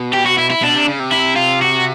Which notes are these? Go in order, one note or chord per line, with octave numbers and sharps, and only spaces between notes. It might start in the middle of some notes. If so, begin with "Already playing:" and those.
Already playing: B2
G4
F#4
E4
E4
B2 D4
C3
C#3
C3
E4
F4
F#4